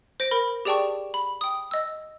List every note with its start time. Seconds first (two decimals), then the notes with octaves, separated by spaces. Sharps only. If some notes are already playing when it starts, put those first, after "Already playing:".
0.20 C5 A#6 D7
0.31 A#4 B5 A#6
0.65 G4 G#4 D5 G5 A5 C#6
1.14 B5
1.41 G5 D#6
1.71 D#5 E6